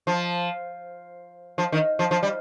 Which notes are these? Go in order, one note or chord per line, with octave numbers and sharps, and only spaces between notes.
F3
F3
D#3
F3
F3
G3